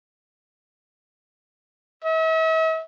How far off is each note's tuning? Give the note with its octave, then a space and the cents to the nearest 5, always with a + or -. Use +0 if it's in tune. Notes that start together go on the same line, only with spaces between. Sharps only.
E5 -45